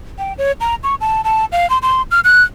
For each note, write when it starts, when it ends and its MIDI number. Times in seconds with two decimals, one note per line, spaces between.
0.19 0.33 79
0.38 0.52 73
0.61 0.75 82
0.84 0.95 85
1.01 1.21 81
1.24 1.45 81
1.52 1.69 77
1.70 1.78 84
1.82 2.02 84
2.11 2.20 89
2.24 2.43 90